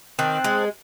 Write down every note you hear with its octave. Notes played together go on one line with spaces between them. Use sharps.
D#3 C4 C5 A5 F#6
G#3